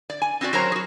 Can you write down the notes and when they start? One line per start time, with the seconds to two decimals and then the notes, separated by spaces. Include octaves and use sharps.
0.10 D5
0.22 G#5
0.41 C4 C#4 F#4 D5
0.53 F#3 F#4 A#4 C5 C#5 A#5
0.72 F#4 G#4